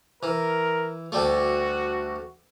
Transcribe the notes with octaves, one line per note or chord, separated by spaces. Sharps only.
E3 A#4
D2 G3 A3 F#4